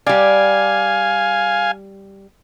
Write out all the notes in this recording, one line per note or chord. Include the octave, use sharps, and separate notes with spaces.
G3 D5 F5 G#5